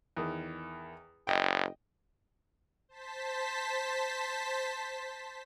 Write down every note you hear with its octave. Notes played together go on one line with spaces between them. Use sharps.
E2 D#3
F#1 D#5 G5
C5 A5 B6